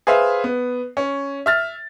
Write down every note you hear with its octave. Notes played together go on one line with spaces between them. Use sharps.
G#4 B4 C5 E5 F5
B3
C#4
E5 F6 A6